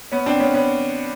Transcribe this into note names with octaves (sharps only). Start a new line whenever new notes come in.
B3 C#4
C4 D4
B3 C#4
B3 C#4